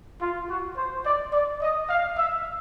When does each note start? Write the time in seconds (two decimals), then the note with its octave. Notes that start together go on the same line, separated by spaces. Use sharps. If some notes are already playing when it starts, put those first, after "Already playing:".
0.22 F4
0.50 F#4
0.77 C5
1.05 D5
1.33 D5
1.62 D#5
1.90 F5
2.18 E5